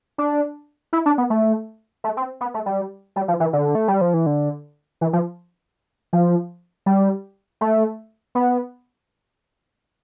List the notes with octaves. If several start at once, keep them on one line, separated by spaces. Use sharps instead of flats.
D4
E4
D4
B3
A3
A3
C4
B3
A3
G3
G3
F3
E3
D3
A3
G3
F3
E3
D3
E3
F3
F3
G3
A3
B3